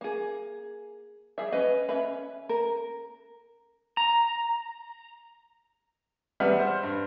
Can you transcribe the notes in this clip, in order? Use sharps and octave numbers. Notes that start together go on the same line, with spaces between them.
A#3 G#4
G3 G#4 E5
C#4 B4 D#5 B5
C#4 B4 E5 B5
A#4
A#5
E2 G3 B4 E5 F#5 F6
C5
G2